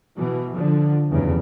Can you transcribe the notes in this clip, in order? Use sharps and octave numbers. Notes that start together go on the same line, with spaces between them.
B2 E3
D3 F3
F1 E2 G2 C#3